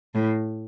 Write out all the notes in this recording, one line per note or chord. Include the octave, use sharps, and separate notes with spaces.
A2